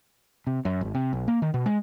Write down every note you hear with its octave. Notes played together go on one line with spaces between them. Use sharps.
C3
F#2
G#1
C3
B1
A#3
D#3
B2
G#3